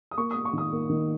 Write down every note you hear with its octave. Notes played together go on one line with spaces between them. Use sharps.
D#6
A#3 C#6
D#6
A#3
C#6
D#3 D#6
A#3
D#3